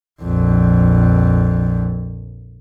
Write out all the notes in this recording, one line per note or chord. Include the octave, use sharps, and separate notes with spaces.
A#1 F2